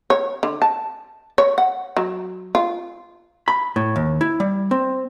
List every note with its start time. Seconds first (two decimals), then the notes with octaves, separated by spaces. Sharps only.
0.10 C#5
0.43 D3
0.62 A5
1.38 C#5
1.58 F#5
1.97 F#3
2.55 F4
3.48 B5
3.76 A2
3.96 D#2
4.21 E4
4.40 G3
4.71 C4